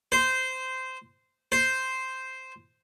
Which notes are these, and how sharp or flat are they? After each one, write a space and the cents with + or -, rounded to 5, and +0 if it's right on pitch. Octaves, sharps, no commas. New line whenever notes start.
C5 -15
C5 -5